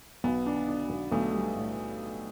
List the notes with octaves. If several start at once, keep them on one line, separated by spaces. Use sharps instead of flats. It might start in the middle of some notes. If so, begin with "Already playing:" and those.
B1 B3
D4
D4
B1
B1 A3
G3
A2